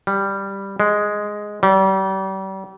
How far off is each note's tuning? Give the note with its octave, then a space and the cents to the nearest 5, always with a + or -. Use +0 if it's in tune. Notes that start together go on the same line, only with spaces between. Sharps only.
G3 +5
G#3 +0
G3 -35